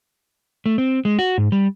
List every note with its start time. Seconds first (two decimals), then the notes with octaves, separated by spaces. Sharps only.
0.66 A3
0.78 C4
1.05 G#3
1.19 F#4
1.38 G#2
1.52 G3